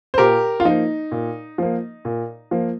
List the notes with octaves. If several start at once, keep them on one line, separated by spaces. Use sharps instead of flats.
C5
A#2 G4 A#4
F4
F3 A#3 D#4
A#2
F3 A#3
A#2
F3 A#3